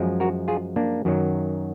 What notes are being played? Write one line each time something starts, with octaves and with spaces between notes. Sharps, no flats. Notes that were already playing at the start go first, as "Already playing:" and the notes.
Already playing: F#2 F3 G#3
F#4 A#4
F4 G#4
A#3 D4
F#2 D#3 F#3